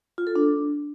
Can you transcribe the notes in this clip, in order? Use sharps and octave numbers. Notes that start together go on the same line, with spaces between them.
F4
A4
D4